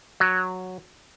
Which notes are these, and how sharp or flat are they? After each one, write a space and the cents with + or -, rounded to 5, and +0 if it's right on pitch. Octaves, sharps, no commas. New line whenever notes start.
F#3 -5